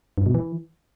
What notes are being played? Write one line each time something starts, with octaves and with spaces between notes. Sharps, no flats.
G2
B2
E3